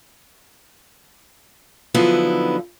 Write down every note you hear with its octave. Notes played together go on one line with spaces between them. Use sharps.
D3 F3 F#3 B3 D#4 E4